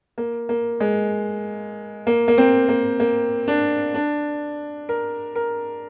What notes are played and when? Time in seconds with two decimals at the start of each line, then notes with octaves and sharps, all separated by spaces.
0.18 A#3
0.49 A#3
0.80 G#3
2.07 A#3
2.28 A#3
2.38 C4
2.69 A#3
3.00 A#3
3.48 D4
3.94 D4
4.89 A#4
5.35 A#4